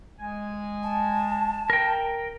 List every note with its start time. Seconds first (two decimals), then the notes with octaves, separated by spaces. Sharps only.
0.19 G#3 G#5
0.83 A5
1.70 A#4 G5